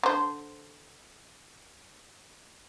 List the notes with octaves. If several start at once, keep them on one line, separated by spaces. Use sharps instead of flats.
D3 C5